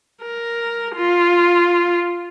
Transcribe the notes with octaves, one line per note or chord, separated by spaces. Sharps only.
A#4
F4